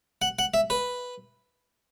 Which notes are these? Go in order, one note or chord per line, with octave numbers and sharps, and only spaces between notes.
F#5
F#5
E5
B4